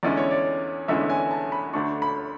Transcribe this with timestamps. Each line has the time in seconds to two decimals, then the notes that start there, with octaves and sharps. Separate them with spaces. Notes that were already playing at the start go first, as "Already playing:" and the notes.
0.03 E2 D3 G#3 C#4 E4 D5
0.17 C#5
0.31 D5
0.88 E2 D3 G#3 C#4 E4 E5
1.09 G#5
1.31 A5
1.52 B5
1.73 D2 D3 A3 D4 C#6
2.02 B5